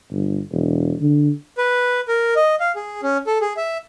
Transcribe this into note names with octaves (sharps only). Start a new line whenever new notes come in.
G1
E1
D3
B4
A#4
D#5
F5
G#4
C#4
A4
G#4
E5